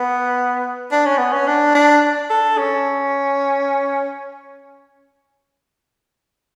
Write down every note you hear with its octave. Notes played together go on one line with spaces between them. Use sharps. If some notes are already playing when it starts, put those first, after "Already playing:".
Already playing: B3
D4
C#4
B3
C#4
D4
D4
A4
C#4